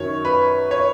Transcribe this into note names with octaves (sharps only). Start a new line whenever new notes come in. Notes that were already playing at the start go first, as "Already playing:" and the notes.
Already playing: F#2 D#3 F#3 C#5
B4
C#5